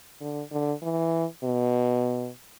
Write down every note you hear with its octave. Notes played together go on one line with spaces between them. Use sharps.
D3
D3
E3
B2